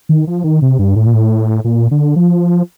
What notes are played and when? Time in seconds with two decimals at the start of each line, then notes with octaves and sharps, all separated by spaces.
0.09 D#3
0.27 F3
0.44 D#3
0.62 C3
0.79 G2
0.96 A2
1.06 A#2
1.14 A2
1.65 A#2
1.91 D3
2.16 F3